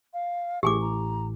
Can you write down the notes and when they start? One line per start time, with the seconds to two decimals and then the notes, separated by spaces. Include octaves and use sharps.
0.14 F5
0.63 A1 A2 G4 G#4 G#5 D6
0.81 A#5